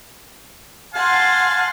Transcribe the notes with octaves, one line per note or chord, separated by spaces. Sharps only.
F5 F#5 G#5 A5 C6